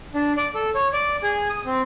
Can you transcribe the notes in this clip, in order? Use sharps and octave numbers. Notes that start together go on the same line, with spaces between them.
D4
D5
A4
C#5
D5
G#4
D#6
C4